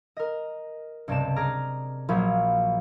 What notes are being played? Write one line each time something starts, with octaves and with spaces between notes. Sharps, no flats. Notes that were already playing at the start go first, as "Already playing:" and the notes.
A#4 D#5
C#2 G2 C3 D5 A5 E7
G#4 A#5 D6 F6
A#1 F3 F#3 A#3 F5 B5